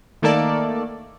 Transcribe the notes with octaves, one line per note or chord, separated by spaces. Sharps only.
D#3 A3 A#3 A4 D5